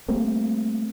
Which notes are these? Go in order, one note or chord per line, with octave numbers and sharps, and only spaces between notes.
G3 A3 A#3 C4